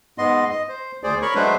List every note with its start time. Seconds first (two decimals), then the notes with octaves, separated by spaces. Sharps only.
0.18 G#2 B3 D#5 C6
0.51 D#5
0.69 C5
1.03 D2 G#4 C5 D5
1.22 A#4 C#5 B5 C#6
1.35 F#3 G#3 A3 D4 B4 C5